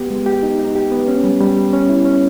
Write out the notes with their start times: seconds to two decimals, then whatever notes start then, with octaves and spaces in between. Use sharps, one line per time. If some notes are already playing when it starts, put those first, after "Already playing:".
Already playing: B3 G4
0.10 G#3
0.26 G4
0.43 D#4
0.59 D#4
0.75 G4
0.91 B3
1.08 C#4
1.24 G3
1.41 G3
1.57 G3
1.73 C#4
1.89 E4
2.05 C#4